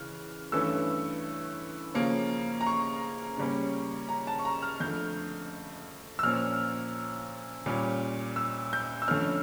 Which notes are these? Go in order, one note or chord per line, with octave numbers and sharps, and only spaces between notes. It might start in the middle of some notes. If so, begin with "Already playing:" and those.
Already playing: C#3 E3 F6
G2 E3 A3 C#4 E6
C#3 F3 A#3 C#4
A#5
C#6
C#3 G3 A#3 C#4
A#5
A5
C#6
A#5
F6
F2 D3 A3 G6
E6
A#2 F3 A#3 C#4 F6
A#2 G3 C#4
E6
G6
E6
F2 D3 A3 C#4 F6